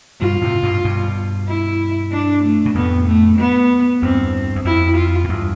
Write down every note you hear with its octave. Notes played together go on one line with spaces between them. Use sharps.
G2 B2 F4
A2 C3
G2 B2
G2 B2
E4
D4
A3
B2
F2 A2 B3
A3
B3
E2 G2 C4
E2
F2 E4
F4
A2
E2 G2